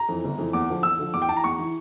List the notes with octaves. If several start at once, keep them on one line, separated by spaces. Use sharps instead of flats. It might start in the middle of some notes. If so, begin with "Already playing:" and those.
Already playing: A#5
F2 E3
G1
F2 E3
E2 D6
D3 F3
E2 E6
D3 F3
E2 D6
G5
E3 A5
A#5
E2 C#6
E3